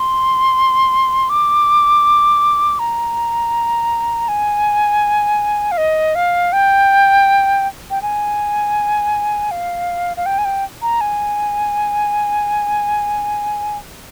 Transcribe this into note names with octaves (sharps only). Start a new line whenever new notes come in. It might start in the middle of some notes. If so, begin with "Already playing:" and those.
Already playing: C6
D6
A#5
G#5
F5
D#5
F5
G5
G5
G#5
F5
F5
G5
G#5
G5
A#5
G#5